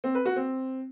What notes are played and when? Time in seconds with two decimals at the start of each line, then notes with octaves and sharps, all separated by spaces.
0.04 C4
0.15 B4
0.25 F#4
0.36 C4